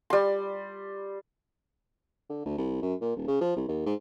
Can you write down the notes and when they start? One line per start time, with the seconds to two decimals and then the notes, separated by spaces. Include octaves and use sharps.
0.10 G3 C6
2.29 D3
2.45 D2
2.58 C2
2.82 F#2
3.01 A#2
3.16 D#1
3.27 C#3
3.41 F3
3.56 C2
3.68 D#2
3.86 G#2